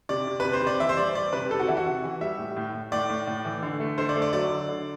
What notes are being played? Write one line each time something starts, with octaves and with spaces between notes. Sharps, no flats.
C3 D5
C3
C3 B4
C5
C3
D5
E3 E5
C5
G3 D5
G3 D5
C3 B4
C3 A4
F#4
E3 E4
F#4
C3
E3
G3 E5
A2
A2
A2
A2 D5
A2
A2
E3
D3
A3
D3 C5
D5
A3
D5
F#3 D5
D3
D3